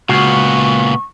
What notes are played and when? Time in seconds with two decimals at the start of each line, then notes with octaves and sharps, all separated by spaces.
0.09 C#2 A#2 B3 F#4 F5 C#6